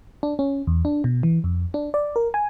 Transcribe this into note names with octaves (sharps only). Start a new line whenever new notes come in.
D4
C#4
E2
D4
B2
E3
F2
D4
D5
A#4
G#5